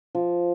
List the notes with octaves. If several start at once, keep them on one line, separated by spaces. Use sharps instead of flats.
F3